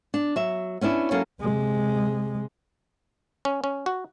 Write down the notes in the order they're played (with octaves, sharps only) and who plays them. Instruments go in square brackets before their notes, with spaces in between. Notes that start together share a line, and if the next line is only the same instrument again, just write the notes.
[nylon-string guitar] D4
F#3 E5
B3 C#4 D4 E4
F#3 A#3 C#4 E4 A4 C#5
[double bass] C3 G#3
[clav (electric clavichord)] C#4
C#4
F#4